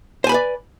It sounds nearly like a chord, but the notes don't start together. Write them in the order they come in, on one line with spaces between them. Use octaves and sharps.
C5 G#5 B5 B4 D5